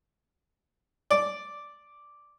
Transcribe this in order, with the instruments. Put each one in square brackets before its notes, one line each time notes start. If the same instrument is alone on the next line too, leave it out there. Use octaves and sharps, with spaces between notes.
[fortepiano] D5